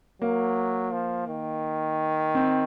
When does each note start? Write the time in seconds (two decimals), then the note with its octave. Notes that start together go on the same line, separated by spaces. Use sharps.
0.22 F#3 A#3
0.92 F3
1.28 D#3
2.35 C4